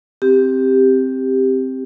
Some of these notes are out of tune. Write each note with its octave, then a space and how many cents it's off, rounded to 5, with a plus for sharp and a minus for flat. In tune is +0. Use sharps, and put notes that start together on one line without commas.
C4 +0 G4 +5